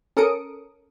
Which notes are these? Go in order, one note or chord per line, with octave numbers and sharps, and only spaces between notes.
C#4 A4 A#4 D#6 C#7 D7